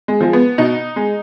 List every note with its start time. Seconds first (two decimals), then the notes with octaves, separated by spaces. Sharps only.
0.08 G#3
0.21 F3 G#3
0.33 B3
0.58 B2 D#4
0.96 G#3